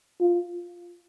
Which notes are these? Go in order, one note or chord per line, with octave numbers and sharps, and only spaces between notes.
F4